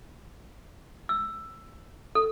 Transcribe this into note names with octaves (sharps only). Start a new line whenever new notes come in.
E6
A4